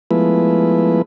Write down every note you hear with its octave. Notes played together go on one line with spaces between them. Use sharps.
F3 G#3 A3 B3 E4 B4